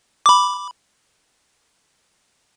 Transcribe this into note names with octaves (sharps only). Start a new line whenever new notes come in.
B5 D6